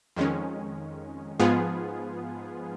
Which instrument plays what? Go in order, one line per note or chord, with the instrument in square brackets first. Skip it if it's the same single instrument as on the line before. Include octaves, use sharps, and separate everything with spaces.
[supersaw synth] F2 D#3 G#3 C#4
G#2 F3 B3 F4 G#4